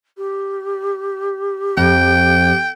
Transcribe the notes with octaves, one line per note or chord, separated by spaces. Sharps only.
G4
F2 G5